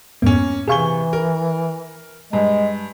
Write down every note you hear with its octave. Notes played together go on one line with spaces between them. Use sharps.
F2 G#2 A#3 B3 C#4
C3 E3 G#4 F5 G#5 C#6 G7
A#4
G2 G#3